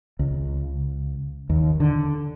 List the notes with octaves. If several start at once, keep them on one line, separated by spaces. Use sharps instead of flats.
C#2
D#2
D3